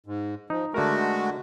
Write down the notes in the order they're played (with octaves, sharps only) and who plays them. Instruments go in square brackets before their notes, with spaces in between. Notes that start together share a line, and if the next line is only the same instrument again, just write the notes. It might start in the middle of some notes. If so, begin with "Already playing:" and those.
[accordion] G#2
[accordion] F3 [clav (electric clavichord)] D#4
[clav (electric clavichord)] D3 A#4 [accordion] G#3 A3 F#4